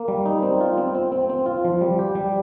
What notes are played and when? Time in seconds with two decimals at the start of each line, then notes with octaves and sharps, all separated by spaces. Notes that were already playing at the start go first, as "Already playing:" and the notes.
Already playing: A#3
0.08 G3
0.26 D#4
0.43 C4
0.61 F4
0.78 C4
0.95 C4
1.12 C4
1.30 C4
1.46 F4
1.64 F3
1.81 G3
1.99 G4
2.15 G3